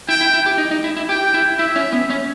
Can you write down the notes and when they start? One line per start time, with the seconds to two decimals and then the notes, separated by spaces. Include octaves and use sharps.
0.08 E4 G5
0.21 E4
0.34 E4
0.46 G4
0.58 D#4
0.71 D#4
0.84 E4
0.96 E4
1.09 G4 G5
1.34 E4
1.59 E4 E5
1.76 C#4
1.93 B3
2.10 C#4